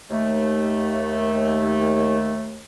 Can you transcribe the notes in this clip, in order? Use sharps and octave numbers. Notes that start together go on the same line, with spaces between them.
D#2 A3